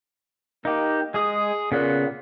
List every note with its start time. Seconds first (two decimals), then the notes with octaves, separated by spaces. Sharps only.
0.65 A#3 D#4 G4
1.14 G#3 G#4 D#6
1.72 A#2 C#3 B3 F#5